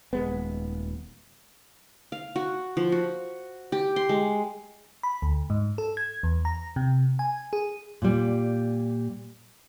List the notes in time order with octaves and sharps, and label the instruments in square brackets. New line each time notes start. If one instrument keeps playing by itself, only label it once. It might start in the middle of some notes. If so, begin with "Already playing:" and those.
[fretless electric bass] D#1 G#3 B3
[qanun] F5
F#4
F3
F#4
G4
C6
G#3
[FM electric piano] B5
D2
G#2
A4
G#6
E2
A#5
C3
G#5
G#4
[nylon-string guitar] A#2 G3